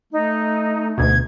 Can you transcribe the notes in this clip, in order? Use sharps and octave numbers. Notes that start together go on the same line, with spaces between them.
A3 D#4
D2 B2 G#6